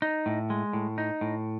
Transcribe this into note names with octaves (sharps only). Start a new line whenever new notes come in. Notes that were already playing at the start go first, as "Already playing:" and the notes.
D#4
A2
G#3
A2
D#4
A2